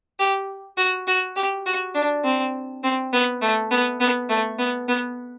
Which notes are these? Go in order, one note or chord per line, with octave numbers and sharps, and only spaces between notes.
G4
F#4
F#4
G4
F#4
D4
C4
C4
B3
A3
B3
B3
A3
B3
B3